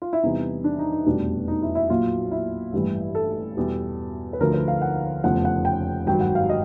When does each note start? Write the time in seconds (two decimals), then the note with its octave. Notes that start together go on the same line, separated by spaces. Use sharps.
0.02 F4
0.13 E4
0.23 E2 C3 E3 G3 D#4
0.64 D4
0.79 D#4
0.92 D#4
1.06 F1 E2 B2 G3 D4
1.48 D#4
1.62 E4
1.75 E4
1.90 A#1 A#2 F#3 F4
2.32 E4
2.73 A1 G2 E3 G3
3.15 A4
3.57 E2 B2 G3
4.33 B4
4.40 D2 D3 F3 A#4
4.53 B4
4.68 F5
4.82 F#5
5.24 F1 E2 C#3 F3 F#5
5.45 F#5
5.65 G5
6.07 G#1 G2 D#3 F#3 G5
6.20 F#5
6.35 F5
6.49 D#5